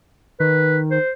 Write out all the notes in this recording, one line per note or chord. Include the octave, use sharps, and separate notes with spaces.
D#3 B4
C5